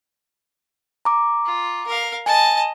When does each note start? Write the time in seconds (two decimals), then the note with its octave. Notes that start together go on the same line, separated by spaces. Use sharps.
1.05 A#5 D6
1.45 F4
1.86 A#4 F5
2.26 D#5 G#5 A5